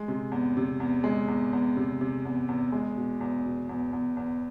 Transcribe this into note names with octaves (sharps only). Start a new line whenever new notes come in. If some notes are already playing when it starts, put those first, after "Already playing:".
Already playing: G#3
C3
E2
C3
E2
G#3
E2
E2
C3
C3
E2
E2
G#3
B2
E2
B2
E2
E2
E2